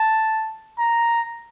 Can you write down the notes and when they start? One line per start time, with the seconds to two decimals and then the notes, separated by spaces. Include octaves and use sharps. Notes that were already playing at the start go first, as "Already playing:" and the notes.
Already playing: A5
0.79 A#5